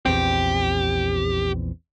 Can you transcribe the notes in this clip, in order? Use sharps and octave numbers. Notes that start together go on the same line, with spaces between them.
A#1 E2 C4 G4